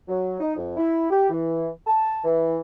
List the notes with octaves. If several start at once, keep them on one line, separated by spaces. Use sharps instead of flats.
F#3
D#4
F2
E4
G4
E3
A5
E3